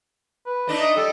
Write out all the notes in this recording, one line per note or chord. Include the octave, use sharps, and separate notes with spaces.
B4
A3 D4 D#4
D#5
G3 A4